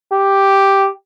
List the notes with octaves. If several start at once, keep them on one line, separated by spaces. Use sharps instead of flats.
G4